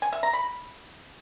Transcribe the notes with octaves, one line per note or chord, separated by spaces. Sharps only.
G#5
E5
A#5
B5